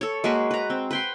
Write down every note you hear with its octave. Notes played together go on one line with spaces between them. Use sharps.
A4 C#5
G#3 A#3 F#4 B4
B4 A#5
C4
B4 G5 C6